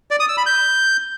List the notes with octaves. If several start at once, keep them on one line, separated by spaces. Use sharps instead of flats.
D5
D#6
E6
B5
G6